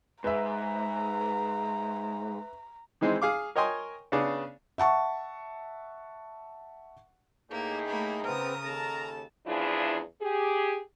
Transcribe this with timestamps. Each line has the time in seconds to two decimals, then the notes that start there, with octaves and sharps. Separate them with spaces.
0.24 G#2 B4 E5 A#5
3.01 D#3 E3 G#3 C4 D#4
3.22 G#4 F5 D6
3.56 A#4 C#5 D#5 G5 G#5 C6
4.12 C#3 B3 D4 G#4 D5
4.78 E5 F#5 A5 C#6
7.51 A2 A#3 D#4 G4 G#4
7.87 A3 A#3 B5
8.25 C#3 B3 C4 A#4 A#5 D#6
8.64 D#2 C#3 A4 A5 A#5
9.47 E2 C#3 F3 D4 E4 G#4
10.22 G4 G#4